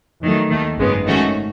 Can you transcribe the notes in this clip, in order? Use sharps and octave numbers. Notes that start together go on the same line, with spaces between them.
E2 D#3 F#3 A3
D#2 D#3 A3
G#1 F#2 C#3 G#3 B3
G#2 D#3 A3 C#4 F#4